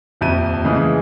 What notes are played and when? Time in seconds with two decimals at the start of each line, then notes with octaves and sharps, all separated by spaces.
0.21 D#1 F2 E5 D#7
0.64 A2 C#3 E3 G#3